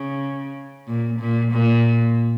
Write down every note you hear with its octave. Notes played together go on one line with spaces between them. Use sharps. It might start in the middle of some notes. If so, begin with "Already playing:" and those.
Already playing: C#3
A#2
A#2
A#2